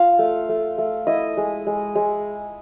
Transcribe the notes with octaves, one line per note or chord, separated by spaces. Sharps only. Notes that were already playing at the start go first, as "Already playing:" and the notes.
Already playing: F4 F5
A3
A3
A3
E4 D#5
G#3
G#3
G#3